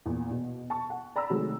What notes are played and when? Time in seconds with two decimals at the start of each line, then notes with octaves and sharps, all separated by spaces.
0.06 E2 A#2
0.31 B2
0.70 A5 C#6
0.90 F#5
1.16 D5 A#5 B5 E6
1.30 C3 D#3 F#3 G#3 A3